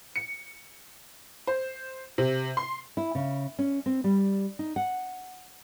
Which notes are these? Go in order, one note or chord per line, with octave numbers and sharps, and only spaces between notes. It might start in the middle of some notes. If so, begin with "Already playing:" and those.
C#7
C5
C3
C6
E4
C#3
C#4
C4
G3
D#4
F#5